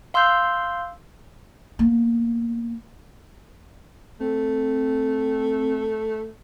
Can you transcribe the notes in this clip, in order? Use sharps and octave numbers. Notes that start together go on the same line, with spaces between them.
F5 C6 E6 F6 G6
A#3 B3
A3 C4